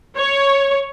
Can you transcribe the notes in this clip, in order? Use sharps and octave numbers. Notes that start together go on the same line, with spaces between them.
C#5